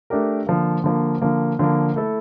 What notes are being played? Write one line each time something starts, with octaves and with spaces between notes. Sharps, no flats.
A3 D4 G4 A#4
D3 F3 A#3
D3 F3 A#3
D3 F3 A#3
D3 F3 A#3
A3 E4 A4